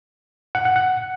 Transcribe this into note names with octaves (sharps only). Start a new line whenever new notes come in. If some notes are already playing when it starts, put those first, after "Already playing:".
F#5
F#5
F#5